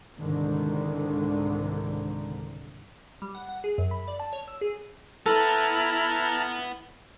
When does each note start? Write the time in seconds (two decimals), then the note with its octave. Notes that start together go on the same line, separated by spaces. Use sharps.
0.19 C2 G#2 D3 D#3
3.22 G3
3.35 F#5
3.49 F#5
3.64 G#4
3.78 F#2
3.91 B5
4.08 D5
4.20 A5
4.33 C#5
4.48 E6
4.61 G#4
5.26 B3 E4 A4 B4 A5 A#5 F6